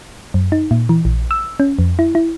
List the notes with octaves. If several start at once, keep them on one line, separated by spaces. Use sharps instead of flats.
F#2
D#4
A#2
E3
A#1
E6
C#4
F2
E4
E4